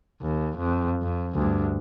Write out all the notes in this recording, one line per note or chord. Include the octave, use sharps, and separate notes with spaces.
D#2
F2
F2
D2 G2